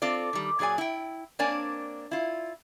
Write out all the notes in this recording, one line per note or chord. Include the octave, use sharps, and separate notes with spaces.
C4 F4 A4 D5
D#3 G3
A#2 F#3 G#4 D5 G#5
E4 G5
A#3 C4 D4 C#5 D5 G#5
E4 F4